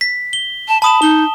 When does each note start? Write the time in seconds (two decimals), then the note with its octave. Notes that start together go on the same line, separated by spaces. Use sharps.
0.01 B6
0.33 G7
0.68 A5
0.82 A5 B5 D#6 E7
1.02 D#4 G7